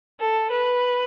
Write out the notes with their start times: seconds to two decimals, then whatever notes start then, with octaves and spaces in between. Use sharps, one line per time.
0.20 A4
0.51 B4